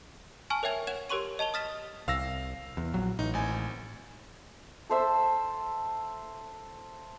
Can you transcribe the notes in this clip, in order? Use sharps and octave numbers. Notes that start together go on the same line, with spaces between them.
G#5 A5 C#6 F6
A#4 C#5 E5 G5 G#6 F7
C#5 F#5 G#6 E7
G4 A#4 C#5 C6 C#6 D#7
D#5 A5 F7 G7
D#6 F6 A6 B6 E7
C2 F5 E6 A#6
E2
A#1 F#3
A1 D#4
G#1 G#5
A4 C5 E5